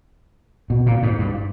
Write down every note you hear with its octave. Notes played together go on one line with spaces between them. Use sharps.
B2
A#2
G#2
G2